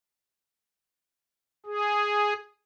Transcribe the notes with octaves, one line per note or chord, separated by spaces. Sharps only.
G#4